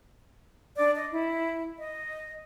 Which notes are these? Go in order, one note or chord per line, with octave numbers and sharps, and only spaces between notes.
D4 D5 D6
D#5
E4
D#5